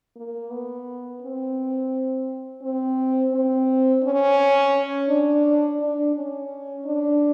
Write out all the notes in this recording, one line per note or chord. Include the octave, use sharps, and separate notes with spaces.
A#3
B3
C4
C4
C4
C#4
D4
D4
C#4
D4